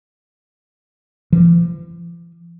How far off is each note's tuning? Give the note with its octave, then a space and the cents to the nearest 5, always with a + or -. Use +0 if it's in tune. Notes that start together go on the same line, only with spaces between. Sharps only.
F3 -45